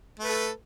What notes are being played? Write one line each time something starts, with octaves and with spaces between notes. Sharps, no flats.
A3 A4 B4